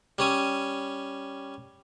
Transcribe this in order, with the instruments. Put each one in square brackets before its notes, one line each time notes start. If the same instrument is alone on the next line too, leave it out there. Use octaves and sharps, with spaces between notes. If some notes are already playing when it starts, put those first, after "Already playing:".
[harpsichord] G3 C#4 D#6